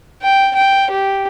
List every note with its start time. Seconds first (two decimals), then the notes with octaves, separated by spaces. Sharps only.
0.22 G5
0.55 G5
0.91 G4